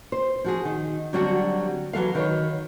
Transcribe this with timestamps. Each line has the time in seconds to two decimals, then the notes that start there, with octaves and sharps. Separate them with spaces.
0.12 C5
0.44 F3 F#4 G#4
0.65 D#3
1.13 D3 F#3 G3 C4 D4 F#4
1.93 E3 F#3 A4 F5
2.15 D#3 B4 C#5